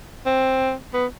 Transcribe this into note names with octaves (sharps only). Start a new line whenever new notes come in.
C4
B3